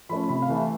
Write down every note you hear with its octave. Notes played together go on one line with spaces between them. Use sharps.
F3 A3 C#4 B5
C3 B5
F5
E3 A3
E5